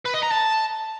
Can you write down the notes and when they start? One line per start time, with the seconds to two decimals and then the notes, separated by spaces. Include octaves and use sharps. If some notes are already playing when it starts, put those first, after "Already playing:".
0.06 B4
0.14 D#5
0.23 A#5
0.32 A5